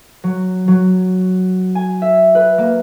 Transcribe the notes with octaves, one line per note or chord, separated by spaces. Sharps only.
F#3
F#3
G#5
E5
B4
A#3